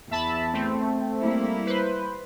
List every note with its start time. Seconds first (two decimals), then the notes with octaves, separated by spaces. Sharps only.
0.11 E2 E5 A5 B5
0.54 A3 C4
1.20 G3 A#3 E4
1.67 B4 C5